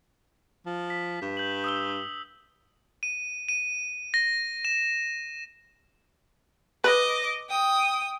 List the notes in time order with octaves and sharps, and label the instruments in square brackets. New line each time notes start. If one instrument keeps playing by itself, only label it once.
[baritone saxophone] F3
[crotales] B6
[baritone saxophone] G2
[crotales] G6 F#7
D#6 E6 G7
D#7
D#7
A#6
E7
[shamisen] B4 [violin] D#5 D6
[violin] G5 D#6